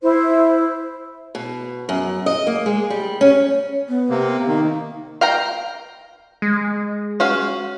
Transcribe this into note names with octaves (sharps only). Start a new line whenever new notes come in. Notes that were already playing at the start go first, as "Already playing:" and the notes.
E4 C5
B2
F#2
D#5
A#3
G#3
G3
C#4
B3
C3 A#3
F5
D#3 A#3 D#4
F5 G5 A#5
G#3
C#4 F#4 F5